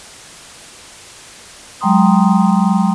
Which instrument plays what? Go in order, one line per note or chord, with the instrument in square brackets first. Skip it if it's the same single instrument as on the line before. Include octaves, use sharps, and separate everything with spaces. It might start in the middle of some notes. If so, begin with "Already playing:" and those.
[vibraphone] F#3 G#3 G5 A#5 C6 D#6